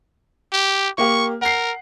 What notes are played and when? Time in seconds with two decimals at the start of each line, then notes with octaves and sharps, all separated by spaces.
0.53 G4
0.98 A#3 G4 C#6
1.41 A#4 F#5 C7